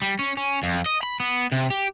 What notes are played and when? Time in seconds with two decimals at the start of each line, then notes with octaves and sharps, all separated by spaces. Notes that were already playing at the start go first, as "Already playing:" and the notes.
0.02 G3
0.19 C#4
0.37 C#4
0.63 F2
0.86 D#5
1.03 B5
1.20 B3
1.52 C3
1.70 G4